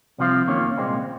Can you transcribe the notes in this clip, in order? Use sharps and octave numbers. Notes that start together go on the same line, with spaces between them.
C2 C3 F3 C4 F4
F#2 D#3 A#3 C#4 F4
C2 A#2 G#3 C4